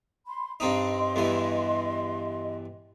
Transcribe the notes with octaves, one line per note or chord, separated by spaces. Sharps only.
B5 C6
G2 C4 D#4 D#5 C6
E2 G2 E3